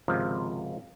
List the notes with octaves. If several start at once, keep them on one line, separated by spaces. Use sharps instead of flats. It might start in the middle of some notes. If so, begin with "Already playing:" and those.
G#1 C#2 C3 F3